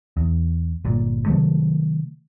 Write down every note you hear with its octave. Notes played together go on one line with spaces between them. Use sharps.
E2
G1 A#2
C3 D#3 F#3 A3